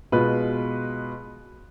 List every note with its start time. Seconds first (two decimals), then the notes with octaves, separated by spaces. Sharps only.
0.12 B2 G#3 F4 B4